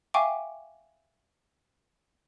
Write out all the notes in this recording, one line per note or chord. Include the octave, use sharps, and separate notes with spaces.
E5 F5 G5 G#5 C#6 D6